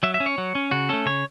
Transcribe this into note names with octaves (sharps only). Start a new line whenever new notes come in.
F#3 E5
E5
C#4
C#5
F#3
C#4
C#3 F#4
A3 C#4 A4
C#3 C#5